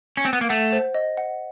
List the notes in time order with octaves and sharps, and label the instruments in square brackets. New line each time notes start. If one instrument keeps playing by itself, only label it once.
[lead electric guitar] C#4
C4
B3
A#3
[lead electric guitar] A3 [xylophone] F#5
[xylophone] C5
D#5
F#5